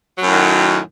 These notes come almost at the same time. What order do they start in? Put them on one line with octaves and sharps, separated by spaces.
F#3 F#2 A2 D#3